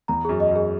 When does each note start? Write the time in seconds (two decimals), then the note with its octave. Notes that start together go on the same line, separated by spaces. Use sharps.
0.08 E2 A#5
0.25 F#2 G#4
0.40 D#5
0.51 F#2 G#4